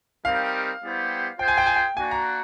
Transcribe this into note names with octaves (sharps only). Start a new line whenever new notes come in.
G3 C4 D#4 G4 A#4 F5
G3 B3 E4 G4 C5
F4 G#4 C5 G5
G#5
G5
G#5
G5
A#3 D4 F#4 G#5
A#5